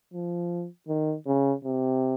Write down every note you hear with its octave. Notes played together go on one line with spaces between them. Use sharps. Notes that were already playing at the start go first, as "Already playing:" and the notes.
F3
D#3
C#3
C3